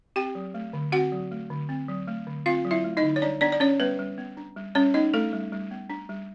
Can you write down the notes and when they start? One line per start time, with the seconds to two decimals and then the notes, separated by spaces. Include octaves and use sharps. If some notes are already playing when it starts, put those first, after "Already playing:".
0.16 C4 G4 G5
0.35 F#3
0.54 A3
0.73 D3
0.92 C4 F#4 F#5
1.12 F#3
1.31 A3
1.50 D3
1.69 C4
1.88 F#3
2.07 A3
2.27 D3
2.46 C4 F4 F5
2.65 F#3
2.71 E4 E5
2.84 A3
2.97 D#4 D#5
3.03 D3
3.16 C#5
3.22 G3 D4 D5
3.41 B3 D4 D5
3.52 D5
3.60 C#4 D4 C#5
3.79 G3 B3 B4
3.99 G3
4.18 B3
4.37 D4
4.56 G3
4.75 G3 C#4 C#5
4.94 B3 D#4 D#5
5.13 A3 D4 A4
5.33 G3
5.52 G3
5.71 B3
5.90 D4
6.09 G3